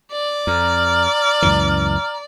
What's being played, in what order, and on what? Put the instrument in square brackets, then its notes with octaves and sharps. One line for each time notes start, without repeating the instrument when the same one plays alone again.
[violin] D5
[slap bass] F2 [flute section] A#5 F6
[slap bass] C#2 F#2 E3